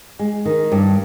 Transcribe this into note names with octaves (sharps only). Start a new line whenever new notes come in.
G#3
D#3
G2